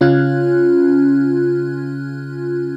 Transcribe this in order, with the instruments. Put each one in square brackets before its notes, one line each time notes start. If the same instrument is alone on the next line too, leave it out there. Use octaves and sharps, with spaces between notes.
[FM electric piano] C#3 C#4 F4 F6 F#6 G#6